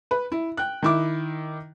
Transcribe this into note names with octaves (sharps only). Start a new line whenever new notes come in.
B4
E4
G5 F#6
D#3 E4 D6